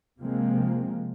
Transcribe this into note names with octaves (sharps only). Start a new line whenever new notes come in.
C3 F3 G#3 A#3 C4